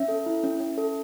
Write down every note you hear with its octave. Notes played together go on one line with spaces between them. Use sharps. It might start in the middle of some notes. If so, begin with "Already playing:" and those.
Already playing: C#4 E5
A4
E4
C#4
C#4
A4